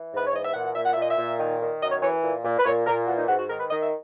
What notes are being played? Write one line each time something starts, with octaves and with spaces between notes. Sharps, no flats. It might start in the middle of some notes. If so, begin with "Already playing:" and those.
Already playing: E3
G#2 B4
C#5
E3 D#5
E5
A#2 F#5
F#5
A#2 E5
F#5
A#2 E5
D#5
E5
A#2
D#3
D#3
F#2 D#5
C#5
E3 C#5
A#2
A#2
B4
A#2 C#5
A#2 A#4
E3 F#4
D#4
G#2 F#4
F#4
D#3 A#4
B4
D#3 D#5
E5